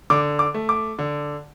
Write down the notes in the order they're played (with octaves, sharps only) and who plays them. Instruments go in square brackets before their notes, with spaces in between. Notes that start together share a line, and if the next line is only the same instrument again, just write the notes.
[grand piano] D3 D6
D6
A3
D6
D3